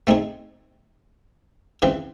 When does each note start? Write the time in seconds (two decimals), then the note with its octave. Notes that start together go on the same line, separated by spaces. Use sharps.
0.07 A3 C4 D#4 G#4
1.82 C#3 E3 C4